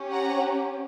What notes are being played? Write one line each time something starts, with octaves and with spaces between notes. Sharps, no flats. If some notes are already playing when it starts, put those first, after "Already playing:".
Already playing: C#4 G4
F#5 A#5